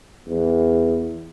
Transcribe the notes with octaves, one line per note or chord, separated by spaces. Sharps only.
E2